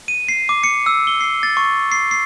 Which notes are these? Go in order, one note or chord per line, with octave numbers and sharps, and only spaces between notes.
D#7
C7
D6
C#7
E6
G7
C7
A6
C#6
C7
C7